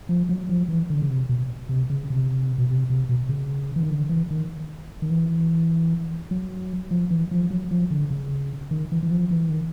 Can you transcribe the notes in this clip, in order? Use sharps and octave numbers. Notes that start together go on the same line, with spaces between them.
F3
F#3
F3
E3
D3
C#3
C3
B2
C3
C#3
C3
B2
C3
C3
B2
C#3
E3
D#3
D3
E3
D#3
D#3
E3
F#3
F3
E3
F3
F#3
F3
D3
C#3
D#3
E3
E3
F3
E3
D#3